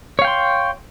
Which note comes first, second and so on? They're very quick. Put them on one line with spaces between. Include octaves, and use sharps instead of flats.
C#5 F5 G5 C6